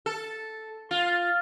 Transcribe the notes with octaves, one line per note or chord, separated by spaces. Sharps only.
A4
F4